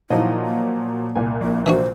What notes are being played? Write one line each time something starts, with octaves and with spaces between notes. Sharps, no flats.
A#2 D#3 F3 F#3 E4 D#5
A#3
C2 A#2 G#5
A#1 A#3
E3 D4 F#4 C5